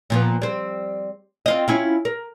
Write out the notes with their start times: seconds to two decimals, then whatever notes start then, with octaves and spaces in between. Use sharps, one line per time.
0.10 A#2 F3 B3
0.42 G3 C4
1.46 C4 F4 D#5
1.68 C#4 E4 F4
2.05 A#4